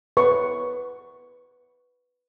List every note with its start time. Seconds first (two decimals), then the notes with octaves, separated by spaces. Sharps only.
0.17 B4 C#6